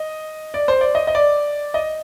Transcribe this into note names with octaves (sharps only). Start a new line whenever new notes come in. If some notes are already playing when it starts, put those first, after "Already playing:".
Already playing: D#5
D5
C5
D5
D#5
D#5
D5
D#5